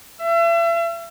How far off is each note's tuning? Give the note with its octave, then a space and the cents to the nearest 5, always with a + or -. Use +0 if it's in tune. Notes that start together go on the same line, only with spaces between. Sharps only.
E5 +40